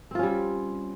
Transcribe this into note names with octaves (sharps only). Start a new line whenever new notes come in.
G3 C4 C#4 F4